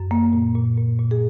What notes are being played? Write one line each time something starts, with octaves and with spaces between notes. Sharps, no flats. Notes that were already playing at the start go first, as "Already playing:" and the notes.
Already playing: F#2
A#3
A#2
A#2
A#2
A#2
G#4